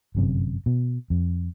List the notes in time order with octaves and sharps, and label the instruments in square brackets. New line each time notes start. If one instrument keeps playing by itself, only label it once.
[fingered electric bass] G1 F#2 C3
B2
F2